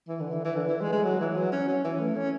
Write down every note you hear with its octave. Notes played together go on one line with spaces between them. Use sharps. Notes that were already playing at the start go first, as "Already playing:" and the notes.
E3
D3
E3
E3
D3
E3
G#3
G#3
F#3
E3
F#3
C#4
C#4
E3
A3
C#4